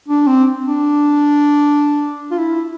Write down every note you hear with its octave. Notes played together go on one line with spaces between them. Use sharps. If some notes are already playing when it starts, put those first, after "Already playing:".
D4
C4
D4
F4
E4